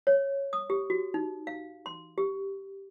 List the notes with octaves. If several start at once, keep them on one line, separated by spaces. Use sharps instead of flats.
C#5
D#6
G4
F#4
D#4
F5
C6
G4